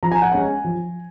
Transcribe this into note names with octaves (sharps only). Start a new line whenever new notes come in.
F3 A#5
G#5
F#5
G#3 C#4 G#5
F3